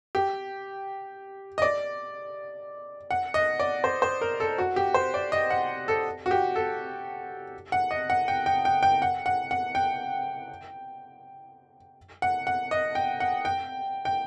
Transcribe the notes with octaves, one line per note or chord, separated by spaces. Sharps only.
G4
D#5
D5
F#5
D#5
D5
C5
C5
A#4
A4
F#4
G4
C5
D5
D#5
F#5
A4
F#4
G4
A4
F#5
D#5
F#5
G5
G5
G5
G5
F#5
F#5
F#5
G5
F#5
F#5
D#5
G5
F#5
G5
G5